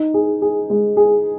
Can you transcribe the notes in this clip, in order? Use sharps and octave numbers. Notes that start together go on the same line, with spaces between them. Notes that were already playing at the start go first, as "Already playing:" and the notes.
Already playing: D#4
G#4
G#4
G#3
G#4